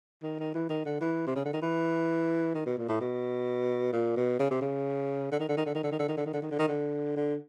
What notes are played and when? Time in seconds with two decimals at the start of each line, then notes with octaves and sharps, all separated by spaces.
0.23 D#3
0.39 D#3
0.54 E3
0.70 D#3
0.85 D3
1.01 E3
1.27 C3
1.36 C#3
1.45 D3
1.53 D#3
1.62 E3
2.55 D#3
2.66 B2
2.78 A#2
2.89 A2
3.01 B2
3.93 A#2
4.17 B2
4.39 C#3
4.51 C3
4.61 C#3
5.32 D3
5.40 D#3
5.49 D3
5.57 D#3
5.66 D3
5.75 D#3
5.83 D3
5.92 D#3
5.99 D3
6.09 D#3
6.17 D3
6.26 D#3
6.33 D3
6.42 D#3
6.51 D3
6.59 D#3
6.68 D3
7.16 D3